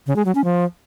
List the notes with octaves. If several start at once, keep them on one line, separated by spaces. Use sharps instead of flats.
C#3
G#3
F#3
C#4
F3